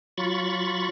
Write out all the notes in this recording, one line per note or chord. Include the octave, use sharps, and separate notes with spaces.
F#3 F4 B5 C#6 A6